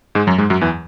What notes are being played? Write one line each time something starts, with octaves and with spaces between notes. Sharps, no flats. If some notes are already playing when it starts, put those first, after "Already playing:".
G#2 G#3
F#2 F#3
G#2 G#3
F#2 F#3
E2 E3